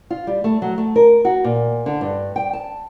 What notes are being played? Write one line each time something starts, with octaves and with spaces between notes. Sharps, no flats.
F4
G3
A3
F#3
A3
A#4
F#4
A#2
D3
G2
G5
A5